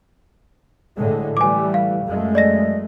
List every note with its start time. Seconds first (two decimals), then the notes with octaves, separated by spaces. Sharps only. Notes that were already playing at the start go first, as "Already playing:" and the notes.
0.96 A2 D3 G#3
1.37 E3 G3 A3 G#5 D6
1.74 F5
2.06 F#2 G#3 A3
2.35 D5 D#5 A#6